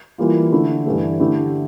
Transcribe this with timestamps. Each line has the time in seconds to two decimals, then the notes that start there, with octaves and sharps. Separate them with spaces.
0.18 E3 G3 A#3 F4
0.52 D3 A3 E4
0.86 G2 E3 A3
1.20 D3 A3 E4 G4